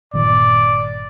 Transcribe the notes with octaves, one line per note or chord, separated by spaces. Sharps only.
G1 A#2 D#3 D5